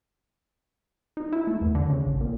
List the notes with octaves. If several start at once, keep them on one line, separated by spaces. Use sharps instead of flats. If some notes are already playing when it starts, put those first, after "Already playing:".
D#4
E4
A3
E2
D3
C#3
A1
A#2